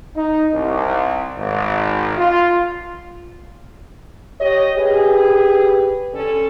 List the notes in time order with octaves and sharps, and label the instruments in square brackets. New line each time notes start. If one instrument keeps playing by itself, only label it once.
[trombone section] D#4
C2
G#1
F4
[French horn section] G4 D#5 [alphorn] C#5
[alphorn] G4 [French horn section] G#4 B4
[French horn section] D3 C#4 A4